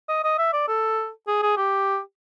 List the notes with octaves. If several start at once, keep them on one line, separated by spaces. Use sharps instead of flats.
D#5
D#5
E5
D5
A4
G#4
G#4
G4